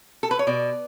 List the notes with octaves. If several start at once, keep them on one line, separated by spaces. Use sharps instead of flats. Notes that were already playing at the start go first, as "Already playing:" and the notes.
A4
B4
C#5
B2 D5